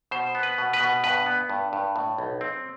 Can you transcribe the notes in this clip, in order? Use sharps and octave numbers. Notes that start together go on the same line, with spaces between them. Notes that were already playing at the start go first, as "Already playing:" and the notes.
B2 C5
B3
B4
B2
B4
B2
G2 B4
B3
G2
G2
A2
B1
C4